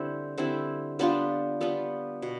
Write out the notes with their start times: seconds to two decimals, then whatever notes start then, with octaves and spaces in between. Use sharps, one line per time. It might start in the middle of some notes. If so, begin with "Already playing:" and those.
Already playing: D3 G3 C4 E4
0.38 D3 G3 C4 E4
0.99 G3 B3 D4 F4
1.61 G3 B3 D4 F4
2.22 B2